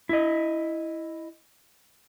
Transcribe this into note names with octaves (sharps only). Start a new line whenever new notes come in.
E4 D#5